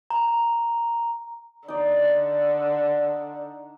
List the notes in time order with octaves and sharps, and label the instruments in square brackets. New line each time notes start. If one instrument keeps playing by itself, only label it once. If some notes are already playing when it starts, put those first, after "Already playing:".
[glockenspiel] A#5
[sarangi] D3 [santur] D#4 D5